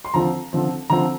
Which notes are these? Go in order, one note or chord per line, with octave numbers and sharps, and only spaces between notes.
C6
D3 F3 C4 A#5
D3 F3 C4
D3 F3 C4 A#5